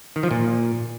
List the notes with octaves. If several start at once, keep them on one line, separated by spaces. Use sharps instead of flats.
D#3
F3
A#2